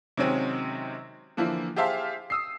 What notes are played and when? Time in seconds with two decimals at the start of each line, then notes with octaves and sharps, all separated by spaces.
0.17 C3 D#3 F#3 G#3 C4 C#4
1.37 D3 E3 F3 A#3 E4
1.76 G4 G#4 C5 E5 F5 A5
2.30 D#6 E6 C7